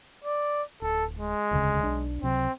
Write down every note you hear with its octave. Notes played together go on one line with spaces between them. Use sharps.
D5
D1 A4
G#3
E1 D2 C#3
B1 D4
C#2 C3 F#3 C4